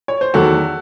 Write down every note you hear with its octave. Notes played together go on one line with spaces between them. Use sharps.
C#5
C5
E2 D#3 F#3 A3 F#4 A4